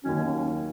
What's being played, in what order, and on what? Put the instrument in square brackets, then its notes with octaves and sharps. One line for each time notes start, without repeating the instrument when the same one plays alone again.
[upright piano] D#2 D#3 F#3 [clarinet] C#4